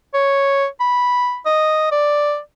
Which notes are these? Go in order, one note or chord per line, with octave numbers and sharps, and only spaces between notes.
C#5
B5
D#5
D5